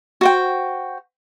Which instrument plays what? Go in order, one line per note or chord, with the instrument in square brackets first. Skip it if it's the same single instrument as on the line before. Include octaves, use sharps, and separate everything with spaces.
[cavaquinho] F#4 C5 G5